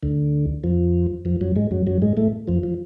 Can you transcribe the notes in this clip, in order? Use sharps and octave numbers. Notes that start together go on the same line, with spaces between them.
D2 D3
F2 F3
F2 F3
F#2 F#3
G#2 G#3
F#2 F#3
F#2 F#3
G#2 G#3
A2 A3
F2 F3
F3